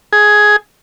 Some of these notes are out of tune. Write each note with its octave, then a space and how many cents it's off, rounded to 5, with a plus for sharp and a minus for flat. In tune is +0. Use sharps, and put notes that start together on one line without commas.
G#4 +10